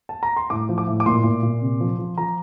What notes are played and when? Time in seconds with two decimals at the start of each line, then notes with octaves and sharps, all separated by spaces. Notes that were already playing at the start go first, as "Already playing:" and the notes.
0.09 A5
0.23 A#5
0.37 C6
0.50 A2 D6
0.69 F3
0.78 D6
0.87 A2
1.00 D6
1.06 A#2 C6
1.24 A#2
1.43 A#2
1.62 C3
1.80 F3
1.99 F3
2.18 F3 A#5